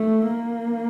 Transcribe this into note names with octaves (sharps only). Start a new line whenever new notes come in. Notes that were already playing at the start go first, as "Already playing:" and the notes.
Already playing: A3
A#3